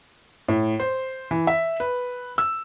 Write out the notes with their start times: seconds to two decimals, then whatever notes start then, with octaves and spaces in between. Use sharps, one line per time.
0.48 A2
0.80 C5
1.31 E3
1.47 E5
1.80 B4
2.38 E6